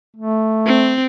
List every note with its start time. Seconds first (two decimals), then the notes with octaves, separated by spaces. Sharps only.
0.17 A3
0.66 C4